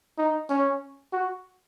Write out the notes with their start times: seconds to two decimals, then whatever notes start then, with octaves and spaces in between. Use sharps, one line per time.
0.18 D#4
0.49 C#4
1.13 F#4